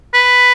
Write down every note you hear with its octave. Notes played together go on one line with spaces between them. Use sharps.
B4